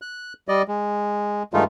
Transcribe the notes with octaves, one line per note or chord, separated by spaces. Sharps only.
F#6
G3 D5 D#5
G#3
G2 D#3 G#3 A3 D#4 F4